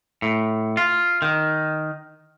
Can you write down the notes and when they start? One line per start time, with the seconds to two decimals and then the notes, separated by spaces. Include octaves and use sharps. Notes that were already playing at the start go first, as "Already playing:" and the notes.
0.22 A2
0.77 F4
1.22 D#3